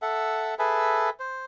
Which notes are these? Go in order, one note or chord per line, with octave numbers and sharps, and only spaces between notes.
A4 E5 F#5
G#4 A4 B4 E5
C5